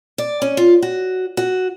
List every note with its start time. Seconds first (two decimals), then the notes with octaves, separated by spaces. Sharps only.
0.18 D5
0.42 C#4
0.57 F4
0.82 F#4
1.37 F#4